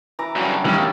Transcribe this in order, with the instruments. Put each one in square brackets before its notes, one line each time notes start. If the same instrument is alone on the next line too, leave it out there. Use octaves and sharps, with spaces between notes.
[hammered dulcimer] E3 A#5 D6
[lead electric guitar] F#2 C#3 [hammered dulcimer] F#3 G3
[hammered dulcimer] D4
[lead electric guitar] D#2 [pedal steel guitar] E3 G3 C#4
[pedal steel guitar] A#3 C#4